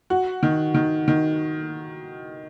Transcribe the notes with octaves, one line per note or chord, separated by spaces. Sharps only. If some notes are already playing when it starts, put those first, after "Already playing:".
F#4
D#3
D#3
D#3